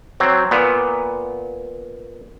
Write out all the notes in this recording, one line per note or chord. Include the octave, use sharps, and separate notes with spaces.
F#3 C4
A#2 B3